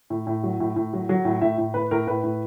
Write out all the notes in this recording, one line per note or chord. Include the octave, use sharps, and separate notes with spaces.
A2
A2
F#3
A2
A2
F#3
F#3
A2
A2 E5
A2
A2 B4
A2 A#4
A2 B4
A2